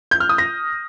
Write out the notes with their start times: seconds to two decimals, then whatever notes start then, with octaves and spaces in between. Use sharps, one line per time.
0.11 G6
0.20 F6
0.29 D#6
0.38 A#6